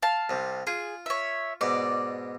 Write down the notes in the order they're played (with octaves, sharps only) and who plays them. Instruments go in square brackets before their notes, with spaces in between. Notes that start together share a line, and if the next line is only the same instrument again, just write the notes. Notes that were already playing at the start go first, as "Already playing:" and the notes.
[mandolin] F5 A5
[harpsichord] C2 C3
[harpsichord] F4 [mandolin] G#4
[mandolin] C#5 E5
[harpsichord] G#2 B2 [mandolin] D5